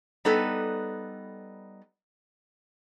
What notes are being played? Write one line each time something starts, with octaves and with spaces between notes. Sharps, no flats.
G3 B3 D#4 A4 B4